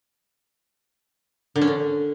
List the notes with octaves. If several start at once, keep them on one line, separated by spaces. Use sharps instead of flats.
D3
C#4
D3